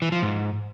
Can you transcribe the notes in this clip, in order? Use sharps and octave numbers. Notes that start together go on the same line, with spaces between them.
E3
F3
G#2